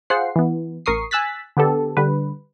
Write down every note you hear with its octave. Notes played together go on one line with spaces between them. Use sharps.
F4 G#4 C5 F#5 C7
E3 B3
A1 A#4 C#6 D#6 C7
G#5 E6 F#6 A6 B6
D3 B3 G4 A4
D3 G3 B4